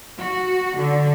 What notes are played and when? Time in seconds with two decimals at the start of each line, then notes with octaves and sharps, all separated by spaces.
0.19 F#4
0.77 D3